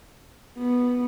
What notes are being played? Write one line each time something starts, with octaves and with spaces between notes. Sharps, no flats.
B3